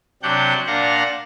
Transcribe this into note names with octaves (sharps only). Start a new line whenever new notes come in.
C3 F#3 D4 G4 F#5 G6
A#2 D4 F5 F#5 A#5